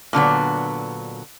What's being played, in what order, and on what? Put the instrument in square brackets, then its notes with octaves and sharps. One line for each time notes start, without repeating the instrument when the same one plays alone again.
[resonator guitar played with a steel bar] A#2 D3 F#3 B3